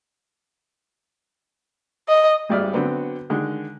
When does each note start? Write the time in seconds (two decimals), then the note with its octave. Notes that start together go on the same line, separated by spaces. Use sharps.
2.08 D#5
2.49 G#1 G2 G#3 D5 E5 F6
2.74 D3 F#3 B3 C4
3.30 D3 D#3 G#3